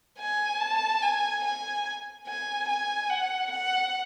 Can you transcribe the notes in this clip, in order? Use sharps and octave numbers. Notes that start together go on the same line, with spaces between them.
G#5
A5
G#5
G#5
G#5
G#5
F#5
F#5